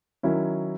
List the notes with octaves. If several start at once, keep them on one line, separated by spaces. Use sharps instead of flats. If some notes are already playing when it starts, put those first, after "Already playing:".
D#3 F#3 C#4 E4